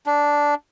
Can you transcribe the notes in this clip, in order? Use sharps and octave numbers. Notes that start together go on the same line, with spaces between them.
D4